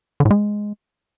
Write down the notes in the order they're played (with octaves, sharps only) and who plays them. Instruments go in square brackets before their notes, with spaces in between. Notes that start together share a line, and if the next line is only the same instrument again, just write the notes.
[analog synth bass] D3
A2
G#3